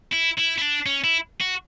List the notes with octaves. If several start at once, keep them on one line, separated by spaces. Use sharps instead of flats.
E4
E4
E4
D4
C#4
E4
F#4